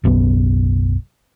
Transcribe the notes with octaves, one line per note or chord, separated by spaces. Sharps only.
F#1 B1 F#2 B3